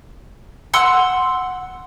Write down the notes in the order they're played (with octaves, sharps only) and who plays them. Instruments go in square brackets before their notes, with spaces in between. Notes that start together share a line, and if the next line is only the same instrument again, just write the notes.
[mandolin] F#5 C6 E6